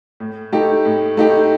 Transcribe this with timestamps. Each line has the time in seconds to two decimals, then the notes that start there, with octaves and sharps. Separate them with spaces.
0.20 A2
0.52 A3 D#4 G4
0.85 A2
1.17 A3 D#4 G4